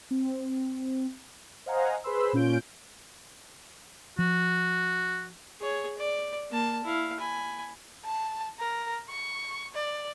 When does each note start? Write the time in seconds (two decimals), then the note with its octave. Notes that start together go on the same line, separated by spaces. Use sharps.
0.11 C4
1.66 C5 D#5 F5 F#5 G#5 A#5
2.04 G#4 B4 C5 B5 C6 E6
2.33 A#2 C#4 F4 G6 D7
4.19 F3 F#4
5.60 G#4 C#5
5.97 D5
6.50 A#3 A5
6.84 E4 F5
7.19 G#5 B5
8.05 A5
8.59 A#4
9.10 C#6
9.75 D5